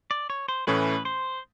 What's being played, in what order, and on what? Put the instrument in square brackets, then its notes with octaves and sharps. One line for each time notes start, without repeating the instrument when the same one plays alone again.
[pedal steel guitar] D5
C#5
C5
[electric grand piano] A2 E3 A3 C#4 [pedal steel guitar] B4
[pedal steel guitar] C5